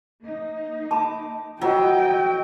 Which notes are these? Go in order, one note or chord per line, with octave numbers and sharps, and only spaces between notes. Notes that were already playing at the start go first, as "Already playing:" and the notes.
A#3 D#4
A5 B5 D6
F#3 F4 C5 D#5 G5 B5